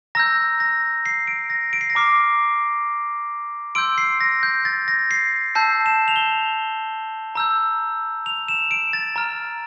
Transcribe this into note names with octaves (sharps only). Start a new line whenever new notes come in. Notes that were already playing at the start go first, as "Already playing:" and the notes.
A#5 E6 G6 A#6
A#6
C7
D7
A#6
D7
C7
A#6
A#5 D6 F6 C7
C6 E6 G6 D7
C7
A#6
G6
A6
A#6
C7
A5 E6 G6 C7
E7
F7
G7
A#5 E6 G6
F7
E7
D7
A6
A#5 F6